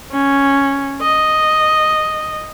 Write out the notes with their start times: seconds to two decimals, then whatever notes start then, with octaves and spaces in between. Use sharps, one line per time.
0.12 C#4
1.01 D#5